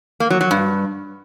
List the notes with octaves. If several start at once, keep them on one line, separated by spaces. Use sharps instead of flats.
A#3
F#3
F#3
G2